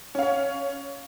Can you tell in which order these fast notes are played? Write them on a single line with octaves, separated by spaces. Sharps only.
C#4 F5 C#5